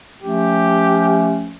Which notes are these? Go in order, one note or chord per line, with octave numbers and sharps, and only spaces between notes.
F3 A3 C#4 G4